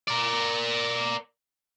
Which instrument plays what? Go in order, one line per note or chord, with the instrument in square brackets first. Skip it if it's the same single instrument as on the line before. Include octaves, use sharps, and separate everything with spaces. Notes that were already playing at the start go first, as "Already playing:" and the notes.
[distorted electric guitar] A#4 D5